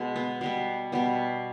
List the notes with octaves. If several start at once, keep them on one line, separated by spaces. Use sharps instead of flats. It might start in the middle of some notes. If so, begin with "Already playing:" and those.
Already playing: B2 G#3
B3
B2 G3 B3
B2 G3 B3